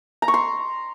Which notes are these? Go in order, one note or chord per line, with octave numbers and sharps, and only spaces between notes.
A#5
C#6
C6